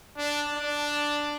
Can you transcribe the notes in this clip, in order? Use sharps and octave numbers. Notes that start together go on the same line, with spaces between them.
D4
D4